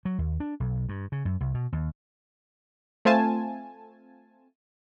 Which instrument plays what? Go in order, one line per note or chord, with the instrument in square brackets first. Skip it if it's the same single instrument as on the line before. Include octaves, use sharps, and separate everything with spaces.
[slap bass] F#3
D#2
D4
B1
G2
C#3
F#2
C2
B2
D#2
[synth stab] A3 C4 F4 G#5 A5